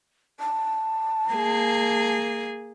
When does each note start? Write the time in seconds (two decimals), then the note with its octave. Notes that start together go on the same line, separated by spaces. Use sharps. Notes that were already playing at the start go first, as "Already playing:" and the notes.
0.40 A5
1.31 A#3 G#4